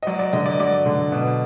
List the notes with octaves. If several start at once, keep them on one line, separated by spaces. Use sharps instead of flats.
D#5
F#3 D5
D5
D3 D#5
D5
F#3 D5
D3
B2